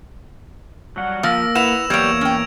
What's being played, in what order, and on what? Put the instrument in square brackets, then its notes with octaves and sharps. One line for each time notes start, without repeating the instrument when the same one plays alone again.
[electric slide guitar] F#3 G3 F#5
[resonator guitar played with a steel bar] F3 [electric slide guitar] A#3 A#4 [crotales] E6 A#6
[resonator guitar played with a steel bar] E4 B4 F#5 [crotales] E7 F7
[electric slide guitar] E2 A#3 C#5 [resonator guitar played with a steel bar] F#3 G3 [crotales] G#6 D7 F7
[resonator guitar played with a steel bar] C#4 G5